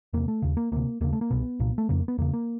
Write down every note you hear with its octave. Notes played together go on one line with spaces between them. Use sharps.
E2 C3 A#3
A3
D#2 C#3
A#3
D2 C3 A#3
D#2 C#3 A#3
A3
A#3
C2 B2 B3
C2 A#2
A3
F2 C#3 A#3
B3
E2 C#3 A#3
A#3